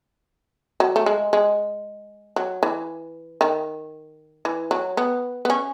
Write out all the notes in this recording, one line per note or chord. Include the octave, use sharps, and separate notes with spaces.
F#3
A3
G#3
G#3
F#3
E3
D#3
E3
F#3
B3
B3
C#4